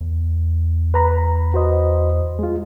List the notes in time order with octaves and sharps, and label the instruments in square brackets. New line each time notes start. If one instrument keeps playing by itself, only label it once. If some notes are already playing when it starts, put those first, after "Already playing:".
[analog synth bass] E2
[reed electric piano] B4 A#5 B5
F#4 C5 D#5
G#3 F4